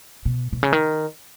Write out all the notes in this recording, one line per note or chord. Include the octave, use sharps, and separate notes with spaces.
B2
B2
C#3
D#3